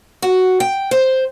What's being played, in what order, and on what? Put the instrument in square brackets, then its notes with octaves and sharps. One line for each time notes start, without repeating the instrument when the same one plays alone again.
[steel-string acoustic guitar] F#4
G5
C5